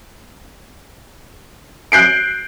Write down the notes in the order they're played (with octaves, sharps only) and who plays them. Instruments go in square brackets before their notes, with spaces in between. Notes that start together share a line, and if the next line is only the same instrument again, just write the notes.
[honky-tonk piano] F#6 G6 C7 D7